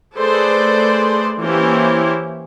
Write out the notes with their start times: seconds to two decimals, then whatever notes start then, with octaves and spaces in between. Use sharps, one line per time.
0.15 A3 G#4 A4 B4 C5 D5
1.41 E3 A#3 C#4 E4 G4 C5